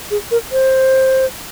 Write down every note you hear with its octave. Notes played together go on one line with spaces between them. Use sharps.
G#4
A#4
C5